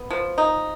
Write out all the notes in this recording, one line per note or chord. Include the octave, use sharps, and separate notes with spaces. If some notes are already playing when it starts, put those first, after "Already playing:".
Already playing: B3
F3
D#4